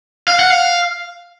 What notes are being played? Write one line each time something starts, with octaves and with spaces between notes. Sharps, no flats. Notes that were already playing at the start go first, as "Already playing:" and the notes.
F5
F#5
F5